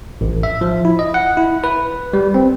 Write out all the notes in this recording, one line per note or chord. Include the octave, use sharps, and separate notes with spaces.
A1
E5
F3
E4
D#5
F#5
E4
B4
G3
C4